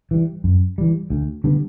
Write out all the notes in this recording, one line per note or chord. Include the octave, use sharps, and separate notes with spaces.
E3 G3
F#2
E3 G3
D2
D3 G3 B3